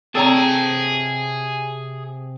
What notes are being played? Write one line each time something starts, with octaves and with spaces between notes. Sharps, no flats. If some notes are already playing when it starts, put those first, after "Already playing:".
C3 C4 G#4 A4 C#5 G5 A5 A#5